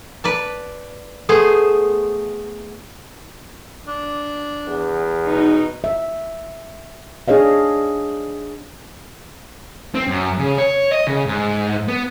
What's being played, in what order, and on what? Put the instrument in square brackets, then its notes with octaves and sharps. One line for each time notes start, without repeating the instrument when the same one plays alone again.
[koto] B4 D5 A5
A3 B3 G#4 C5
[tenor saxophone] D4
[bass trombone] E2
[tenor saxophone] B2 [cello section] D#4
[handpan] E5
D4 G#4 C#5 D#5 F5
[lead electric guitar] C4
F#2
C#3
C#5
D#5
C#3
G#2
B3